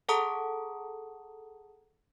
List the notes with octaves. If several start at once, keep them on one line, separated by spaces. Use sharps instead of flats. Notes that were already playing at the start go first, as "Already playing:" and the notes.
G#4 A4 F#5 A5 A#5 D#6